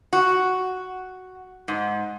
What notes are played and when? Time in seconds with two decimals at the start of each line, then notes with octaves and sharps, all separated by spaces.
0.13 F#4
1.68 G#2